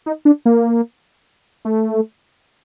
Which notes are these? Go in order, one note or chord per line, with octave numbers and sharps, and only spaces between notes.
D#4
D4
A#3
A3